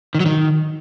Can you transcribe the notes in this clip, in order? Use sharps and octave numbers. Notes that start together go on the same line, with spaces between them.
D#3
F#3
D#3